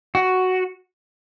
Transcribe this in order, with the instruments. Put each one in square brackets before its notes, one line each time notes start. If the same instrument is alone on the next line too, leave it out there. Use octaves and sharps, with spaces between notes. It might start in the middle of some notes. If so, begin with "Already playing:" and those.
[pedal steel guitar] F#4